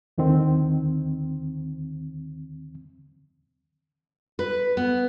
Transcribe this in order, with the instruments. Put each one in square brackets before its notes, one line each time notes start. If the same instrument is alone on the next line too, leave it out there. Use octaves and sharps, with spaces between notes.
[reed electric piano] D#2 D3 D#3 C4
[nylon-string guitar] B4
B3